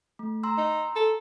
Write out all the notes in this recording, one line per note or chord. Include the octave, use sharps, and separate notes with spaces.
A3
A#5 C6 E6
D#4
A4